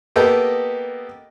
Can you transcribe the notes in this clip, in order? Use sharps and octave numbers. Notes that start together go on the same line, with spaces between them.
A#3 B3 G4 A4 D#5 G5